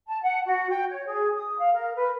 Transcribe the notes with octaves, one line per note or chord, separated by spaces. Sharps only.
A5
F#5
F#4
G5
C#5
G#4
D#6
F5
A#4
B4